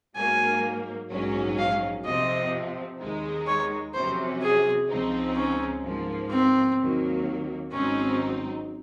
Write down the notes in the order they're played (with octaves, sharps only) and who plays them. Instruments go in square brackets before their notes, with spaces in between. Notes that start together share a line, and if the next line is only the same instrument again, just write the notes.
[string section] G#2 F#3 A#3 [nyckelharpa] G#5
[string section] A#1 G#2 F#3 C#4
[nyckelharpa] F5
[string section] F2 C3 F3 C4 [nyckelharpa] D#5
[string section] D#2 D#3 G#3 D#4
[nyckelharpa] C#5
[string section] F2 C3 F#3 C#4 [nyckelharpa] C5
[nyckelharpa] G#4
[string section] C#2 C#3 F3 C4 D#4
[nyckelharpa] C#4
[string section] G#2 F3 A#3
[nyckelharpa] C4
[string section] D#2 D#3 F#3 A#3
[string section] G#1 G#2 F#3 C4 D#4 [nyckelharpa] C#4